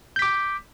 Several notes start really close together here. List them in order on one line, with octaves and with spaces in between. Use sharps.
G6 B6 D6